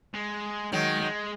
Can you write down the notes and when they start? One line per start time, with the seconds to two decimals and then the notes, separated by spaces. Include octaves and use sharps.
0.14 G#3
0.72 D#3 F#3 G#3
1.01 G#3